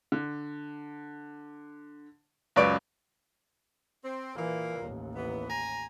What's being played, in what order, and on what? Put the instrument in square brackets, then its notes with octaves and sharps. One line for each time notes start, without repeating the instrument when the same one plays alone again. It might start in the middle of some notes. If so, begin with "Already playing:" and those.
[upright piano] D3
C#2 F#2 B4 D5 C#6 D7
[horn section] C4
[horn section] A#2 A#3 [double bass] E3
[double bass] A1 D#2
[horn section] E3 B3
G#5 A#5